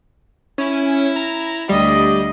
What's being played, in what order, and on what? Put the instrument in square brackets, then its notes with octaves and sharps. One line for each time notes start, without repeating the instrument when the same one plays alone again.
[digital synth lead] C#4 [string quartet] E4
[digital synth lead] A#5
[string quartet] D2 D#5 [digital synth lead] G3